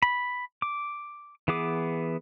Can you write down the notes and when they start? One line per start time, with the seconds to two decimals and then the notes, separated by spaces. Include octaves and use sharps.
0.03 B5
0.62 D6
1.48 E3 B3 G#4 D6